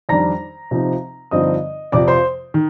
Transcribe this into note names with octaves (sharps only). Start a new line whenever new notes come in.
F2 D#3 G3 D4 A#5 A#6
C3 F3 C4 D#4
G2 D3 F3 C4 D#4 D#5 D#6
F2 C3 F3 C4 D5 D6
C5 C6
D#3